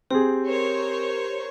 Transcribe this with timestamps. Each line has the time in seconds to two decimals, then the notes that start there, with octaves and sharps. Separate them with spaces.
0.11 C4 G4 G#4
0.47 A#4 C5 C#5